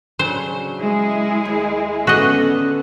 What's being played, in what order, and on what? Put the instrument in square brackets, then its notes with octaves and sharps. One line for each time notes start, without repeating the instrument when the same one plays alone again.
[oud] C#3 F#3 D4 [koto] C5
[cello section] G#3 E4 G#4
[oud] D#2
[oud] D3 [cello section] B3 C#4 [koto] F#4 D#5